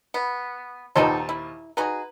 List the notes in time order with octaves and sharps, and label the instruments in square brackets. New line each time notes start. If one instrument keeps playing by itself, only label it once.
[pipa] B3
[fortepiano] D#2 A#2 C5 [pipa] B3 D#4 A4
[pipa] E4
[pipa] D#4 F#4 G#4 [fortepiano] B4